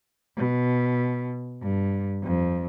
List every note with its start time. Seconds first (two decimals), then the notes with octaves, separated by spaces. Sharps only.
0.37 B2
1.62 G2
2.24 F2